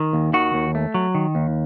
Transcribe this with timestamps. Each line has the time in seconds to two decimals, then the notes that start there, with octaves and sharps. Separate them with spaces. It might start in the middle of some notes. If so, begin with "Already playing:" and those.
Already playing: D#3
0.13 D#2
0.34 D#3 F#4
0.54 D#2
0.75 A3
0.94 F#3
1.15 D#3
1.35 D#2